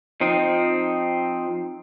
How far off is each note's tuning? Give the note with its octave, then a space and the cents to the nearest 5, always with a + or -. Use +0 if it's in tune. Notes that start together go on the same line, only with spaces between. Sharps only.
F3 +10 C4 +0 D#4 +0